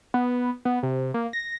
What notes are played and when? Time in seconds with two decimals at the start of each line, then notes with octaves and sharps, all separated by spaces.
0.14 B3
0.65 B3
0.83 C3
1.14 A#3
1.33 A#6